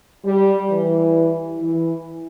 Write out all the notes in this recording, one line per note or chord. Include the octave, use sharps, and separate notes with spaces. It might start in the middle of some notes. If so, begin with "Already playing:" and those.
G3
E3
E3